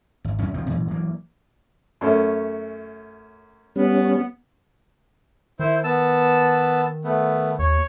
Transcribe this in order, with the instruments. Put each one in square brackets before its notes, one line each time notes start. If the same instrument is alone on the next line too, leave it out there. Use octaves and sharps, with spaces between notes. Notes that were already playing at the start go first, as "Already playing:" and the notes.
[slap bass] G#1
F#2 C#4
B1 D#3 F3 C4
A#2 E3 F#3
E3 F#3 A#3
[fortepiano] F#2 A3 C#4
[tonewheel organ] G3 C#4 [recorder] B3
[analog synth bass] D#3 [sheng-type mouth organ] E4 C5
[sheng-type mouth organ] B3 A5 E6
A3 B3
[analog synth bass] D#2 [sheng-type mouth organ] C#5